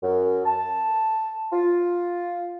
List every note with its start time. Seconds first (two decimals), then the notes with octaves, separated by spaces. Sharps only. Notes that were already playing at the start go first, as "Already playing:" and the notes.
0.03 F#2
0.45 A5
1.52 F4